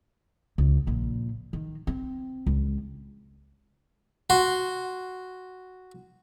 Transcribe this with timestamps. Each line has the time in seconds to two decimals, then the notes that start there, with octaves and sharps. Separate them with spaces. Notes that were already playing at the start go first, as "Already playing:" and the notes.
0.58 C#2
0.87 A#1 A#2
1.53 D#3
1.87 C4
2.46 C#2
4.30 F#4 C6